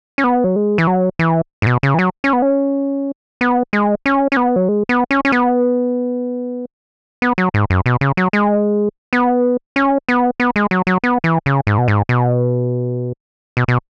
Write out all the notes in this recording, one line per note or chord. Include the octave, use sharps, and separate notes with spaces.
C#4
B3
F#3
G#3
E3
F#3
E3
G#2
B2
C#3
E3
F#3
C#4
B3
C#4
B3
G#3
C#4
C#4
B3
F#3
G#3
B3
C#4
C#4
B3
B3
F#3
G#2
F#2
B2
C#3
F#3
G#3
B3
C#4
B3
B3
G#3
F#3
F#3
B3
E3
C#3
G#2
B2
G#2
B2
B2
B2